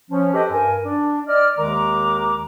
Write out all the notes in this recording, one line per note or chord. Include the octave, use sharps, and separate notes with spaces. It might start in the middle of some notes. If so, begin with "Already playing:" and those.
F3 C#4
G4 A4 B4 C5 D#5
G2 A#4 G#5
D4
D5 D#5 F6
D#2 D#3 G#3 A#4 A#5 D6